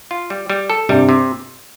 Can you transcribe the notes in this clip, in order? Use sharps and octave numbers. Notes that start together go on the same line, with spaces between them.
F4
G3
G3
A4
G2 C3 G3
C3